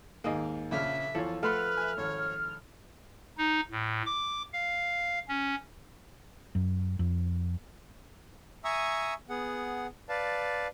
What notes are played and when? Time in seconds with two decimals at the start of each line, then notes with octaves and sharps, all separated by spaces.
0.24 D#2 G#2 A#3 G#4 D#5
0.71 A#1 C#3 E5 F6
1.15 E2 F3 A4 C#5
1.43 A3 A4 B4 F#5 B5 C6 F6
1.77 E5 G#5
1.97 G#1 C#5
3.38 D#4
3.71 A2
4.06 D6
4.53 F5
5.28 C#4
6.55 F#2
6.99 F2
8.64 E5 G#5 A#5 C#6 D#6 E6
9.29 B3 G#4 F#5
10.09 B4 D5 F5 A5